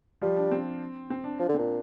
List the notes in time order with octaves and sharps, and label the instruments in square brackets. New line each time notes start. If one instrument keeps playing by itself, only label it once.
[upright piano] F3 F4 [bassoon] G3
[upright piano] D4
C4
C4
D4
[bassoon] F3 [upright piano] D4
[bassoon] D3
[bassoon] A#2 [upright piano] C4